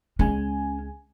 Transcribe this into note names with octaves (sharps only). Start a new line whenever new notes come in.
C#2 G#3 C#4 G#5